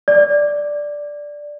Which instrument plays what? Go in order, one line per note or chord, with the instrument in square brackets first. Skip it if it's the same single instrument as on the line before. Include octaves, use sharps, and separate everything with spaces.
[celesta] D5